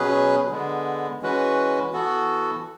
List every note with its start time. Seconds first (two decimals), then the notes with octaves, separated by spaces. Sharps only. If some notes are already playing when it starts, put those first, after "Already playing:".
Already playing: B2 F#3 C#4 G#4 B4
0.50 D3 G#3 B3
1.22 E3 G#3 C#4 F#4 B4
1.93 E3 B3 F#4 A4